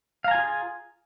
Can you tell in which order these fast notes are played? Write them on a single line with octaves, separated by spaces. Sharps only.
F5 A#5 G#5 F4 G#4